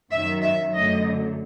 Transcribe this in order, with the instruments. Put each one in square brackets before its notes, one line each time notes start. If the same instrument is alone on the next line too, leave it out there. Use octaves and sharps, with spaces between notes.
[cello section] F#2 D#3 F#3 E5
E5
F#2 D3 F#3 A3 D#5